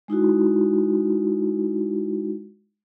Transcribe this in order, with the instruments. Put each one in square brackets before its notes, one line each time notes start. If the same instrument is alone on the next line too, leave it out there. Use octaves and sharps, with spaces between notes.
[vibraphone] G#3 D#4 E4 F#4